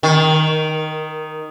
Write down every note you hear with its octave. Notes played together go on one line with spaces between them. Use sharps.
D#3